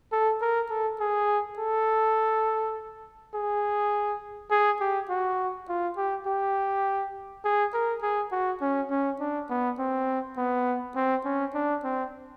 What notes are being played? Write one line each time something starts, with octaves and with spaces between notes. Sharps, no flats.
A4
A#4
A4
G#4
A4
G#4
G#4
G4
F#4
F4
G4
G4
G#4
A#4
G#4
F#4
C#4
C#4
D4
B3
C4
B3
C4
C#4
D4
C4